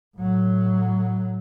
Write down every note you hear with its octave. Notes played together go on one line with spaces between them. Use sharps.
A2 F#3